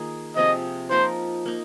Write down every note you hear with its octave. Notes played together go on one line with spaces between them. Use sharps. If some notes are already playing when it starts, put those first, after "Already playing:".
Already playing: D#3 A#3 F4 G#4
C3 F3 C4 G#4 D#5
F3 A#3 D#4 A#4 C5
A#3 D#4